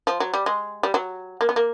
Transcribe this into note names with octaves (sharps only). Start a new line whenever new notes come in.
F3
F#3
G3
G#3
G3
F#3
A#3
B3
A#3